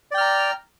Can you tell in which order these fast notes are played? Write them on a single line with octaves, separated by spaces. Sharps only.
D5 G5 F6 A#5